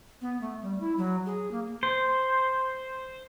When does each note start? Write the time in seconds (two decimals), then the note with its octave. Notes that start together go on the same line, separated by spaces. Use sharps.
0.22 B3
0.41 A3
0.62 G3
0.80 E4
0.98 F#3
1.26 G#4
1.51 A#3
1.83 C5